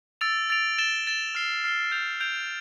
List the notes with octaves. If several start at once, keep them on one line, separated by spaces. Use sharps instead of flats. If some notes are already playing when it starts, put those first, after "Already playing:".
E6 A6 D7 F7
E6 A6 D7 F7
A6 E7 G7
A6 E7 G7
F6 C7 G7
F6 C7 G7
G6 D7 F7
G6 D7 F7